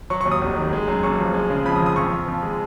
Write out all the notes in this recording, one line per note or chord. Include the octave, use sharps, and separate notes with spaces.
F#3 C#6
D#2 C#6
D#6
F1
D#3
G#3
F#2
F#1 C#6
F3
G#3
C#3
F2 B5
D#6
F3
D#6
F2 C#6
F3
F2
G#3